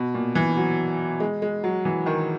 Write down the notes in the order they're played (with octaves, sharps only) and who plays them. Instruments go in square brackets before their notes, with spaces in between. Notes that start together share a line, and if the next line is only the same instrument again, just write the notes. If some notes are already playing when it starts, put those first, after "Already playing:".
Already playing: [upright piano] B2
A#2
E3
F#3
G#3
G#3
F#3
E3
D#3